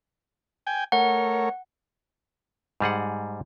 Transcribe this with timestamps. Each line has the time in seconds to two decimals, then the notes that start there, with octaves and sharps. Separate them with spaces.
0.67 G5 G#5
0.92 A3 A#4 C#5 F#5
2.80 G#2 G3 G#4 F#5